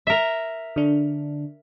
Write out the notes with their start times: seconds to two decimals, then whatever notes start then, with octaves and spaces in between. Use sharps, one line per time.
0.07 A#4 E5
0.76 D3 D4